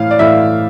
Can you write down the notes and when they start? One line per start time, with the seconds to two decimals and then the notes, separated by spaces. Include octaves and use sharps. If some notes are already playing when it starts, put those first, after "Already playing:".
Already playing: A2 E3 F5
0.11 D5
0.19 A2 E3 E5